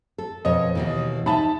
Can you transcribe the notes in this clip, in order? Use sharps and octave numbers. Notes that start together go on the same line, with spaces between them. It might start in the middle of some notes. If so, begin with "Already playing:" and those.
A4
F2 B2 C#5 D#5
D#2 B2 E3
D#4 E5 A5 B5